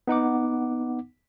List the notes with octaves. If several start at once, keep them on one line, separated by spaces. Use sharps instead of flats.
B3 D#4 F#5 D6